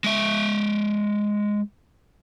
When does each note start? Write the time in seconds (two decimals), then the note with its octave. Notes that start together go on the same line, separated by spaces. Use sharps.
0.04 G#3 E5